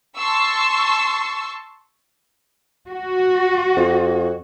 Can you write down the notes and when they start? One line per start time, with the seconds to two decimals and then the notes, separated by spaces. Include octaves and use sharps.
0.17 A5 C6 C#6 E6
2.88 F#4
3.77 F2